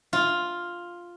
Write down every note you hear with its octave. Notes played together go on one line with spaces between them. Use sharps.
F4